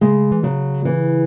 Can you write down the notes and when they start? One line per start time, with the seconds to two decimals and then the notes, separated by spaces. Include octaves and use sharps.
0.01 C#3 G#3
0.32 E3
0.43 C#3 F#3
0.85 E3